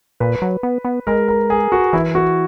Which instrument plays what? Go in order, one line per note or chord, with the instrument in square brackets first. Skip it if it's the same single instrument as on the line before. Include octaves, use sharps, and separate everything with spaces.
[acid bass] A#2 [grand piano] B4
[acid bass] F#3
B3
B3
[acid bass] G#3 [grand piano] A#4
[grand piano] A#4
G#4
F#4
[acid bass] E3 [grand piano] E4
[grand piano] F#4